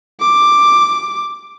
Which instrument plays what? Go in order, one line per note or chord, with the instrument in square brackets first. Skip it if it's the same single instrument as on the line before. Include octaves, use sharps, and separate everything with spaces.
[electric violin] D6